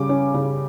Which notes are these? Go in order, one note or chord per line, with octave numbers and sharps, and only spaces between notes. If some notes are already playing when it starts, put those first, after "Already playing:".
Already playing: C#3 G3 D6
C#4
C#3